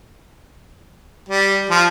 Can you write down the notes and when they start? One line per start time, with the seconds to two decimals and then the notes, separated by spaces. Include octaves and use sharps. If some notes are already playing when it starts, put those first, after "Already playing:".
1.29 G3
1.70 F3